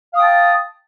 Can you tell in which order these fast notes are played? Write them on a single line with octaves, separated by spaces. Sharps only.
F5 D#6 G5 A5